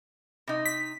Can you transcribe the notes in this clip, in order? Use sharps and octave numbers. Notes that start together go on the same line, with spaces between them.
C3 D#4
B6